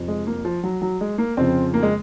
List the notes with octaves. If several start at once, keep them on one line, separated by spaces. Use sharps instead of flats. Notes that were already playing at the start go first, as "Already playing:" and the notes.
Already playing: F2 C3 F3
G#3
A#3
F3
F#3
F#3
G#3
A#3
F2 C#3 F3 C4
A#3
G#3